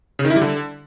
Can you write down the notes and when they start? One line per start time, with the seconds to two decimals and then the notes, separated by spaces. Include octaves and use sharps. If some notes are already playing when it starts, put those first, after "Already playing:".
0.19 C#3
0.25 D#3
0.30 E4
0.36 G3
0.41 D3